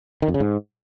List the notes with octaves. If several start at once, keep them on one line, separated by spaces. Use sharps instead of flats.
D#3
F2
C#3
G#2